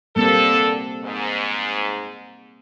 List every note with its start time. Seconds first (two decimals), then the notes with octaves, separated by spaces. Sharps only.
0.16 D3 G3 A#3 C4 A4
1.04 G#2